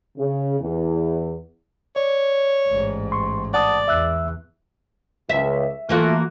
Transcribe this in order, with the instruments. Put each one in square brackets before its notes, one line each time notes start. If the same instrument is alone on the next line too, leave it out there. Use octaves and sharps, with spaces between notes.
[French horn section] C#3
E2
[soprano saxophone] C#5 [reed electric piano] D5
[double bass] A1 G#2
[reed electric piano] C6 C#6
[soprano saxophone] D5 [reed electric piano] F#5 A5 D#6
[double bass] E2 [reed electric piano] E5 E6 F#6
[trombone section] C#2 [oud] E5
[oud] E3 A#3 F#4 [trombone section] A3 F4